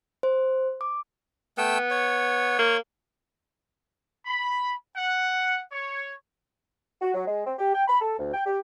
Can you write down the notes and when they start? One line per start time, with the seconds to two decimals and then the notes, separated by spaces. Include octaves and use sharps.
0.23 C5
0.81 D6
1.58 A3 B3 G5 E6
1.90 C#5
2.59 A#3
4.26 B5
4.97 F#5
5.72 C#5
7.02 F#4
7.14 F#3
7.26 G#3
7.45 C4
7.59 G4
7.74 G5
7.88 B5
8.01 A4
8.18 D2
8.33 G5
8.46 G4